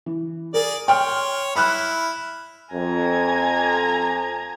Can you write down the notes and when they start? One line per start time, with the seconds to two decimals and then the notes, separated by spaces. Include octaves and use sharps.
0.06 E3
0.54 G#4 A#4 D5
0.88 C#5 G5 C6 F6
1.56 E4 B5 F6 F#6
2.73 F2 G#5 A#5 G#6